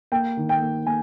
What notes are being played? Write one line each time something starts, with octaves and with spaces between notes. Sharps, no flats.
A#3 G5
D#3
G5
A#3
A#3 G#5